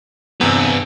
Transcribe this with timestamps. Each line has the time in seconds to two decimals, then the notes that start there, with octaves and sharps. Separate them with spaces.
0.41 E2 G2 C3 B3